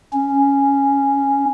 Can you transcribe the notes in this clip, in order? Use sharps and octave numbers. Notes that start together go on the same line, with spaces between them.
C#4